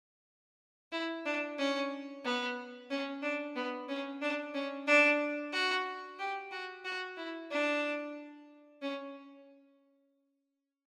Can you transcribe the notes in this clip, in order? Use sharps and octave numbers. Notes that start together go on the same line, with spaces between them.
E4
D4
C#4
B3
C#4
D4
B3
C#4
D4
C#4
D4
F#4
G4
F#4
F#4
E4
D4
C#4